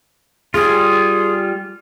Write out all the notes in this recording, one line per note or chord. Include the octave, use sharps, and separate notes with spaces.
G3 F4 G#4